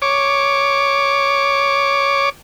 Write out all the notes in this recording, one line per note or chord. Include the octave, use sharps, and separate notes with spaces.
C#5 D6